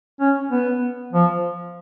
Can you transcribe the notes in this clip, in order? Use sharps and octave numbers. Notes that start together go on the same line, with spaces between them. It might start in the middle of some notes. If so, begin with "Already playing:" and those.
C#4
B3
F3